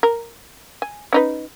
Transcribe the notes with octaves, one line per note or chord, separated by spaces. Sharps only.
A#4
G#5
C#4 D#4 B4